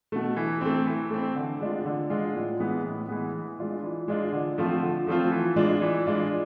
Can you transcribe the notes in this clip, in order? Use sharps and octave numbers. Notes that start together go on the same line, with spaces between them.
B2 A3
E3
A3 C4
E3
A3 C4
D3
G#3 D4 F4
D3
G#3 D4 F4
A2
E3 G#3 B3
A2
E3 G#3 B3
E3
G#3 D4 F4
E3
G#3 D4 F4
D3
F3 A3 C4 F4
D3
F3 A3 C4 F4
E3
G#3 D4 F4
E3
G#3 D4 F4